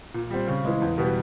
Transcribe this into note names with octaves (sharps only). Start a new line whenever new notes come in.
A#2
G3 C4
C#3
E3 G#3
E2
B2 G3 B3